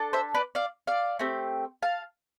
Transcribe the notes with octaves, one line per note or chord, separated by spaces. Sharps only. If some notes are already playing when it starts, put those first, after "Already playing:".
Already playing: D4 A4
C5 E5
B4 D5
D5 F5
D5 F5
A3 C4 G4
F5 A5